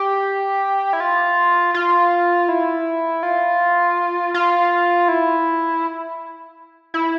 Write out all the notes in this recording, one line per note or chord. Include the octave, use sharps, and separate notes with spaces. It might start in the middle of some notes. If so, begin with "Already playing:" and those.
Already playing: G4
E4
F4
F4
E4
F4
F4
E4
E4